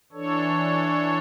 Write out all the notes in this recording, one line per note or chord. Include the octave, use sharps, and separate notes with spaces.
E3 D4 A4 C#5